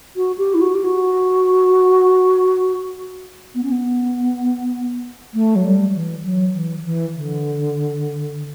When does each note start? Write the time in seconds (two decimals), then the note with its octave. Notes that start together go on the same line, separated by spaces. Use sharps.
0.16 F#4
0.38 G4
0.54 E4
0.61 F#4
0.74 G4
0.84 F#4
3.55 B3
3.63 C#4
3.72 B3
5.34 A3
5.56 F#3
5.64 G3
5.95 E3
6.24 F#3
6.54 E3
6.85 E3
7.16 D3